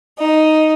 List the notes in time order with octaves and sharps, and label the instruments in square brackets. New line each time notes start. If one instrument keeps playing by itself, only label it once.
[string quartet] D#4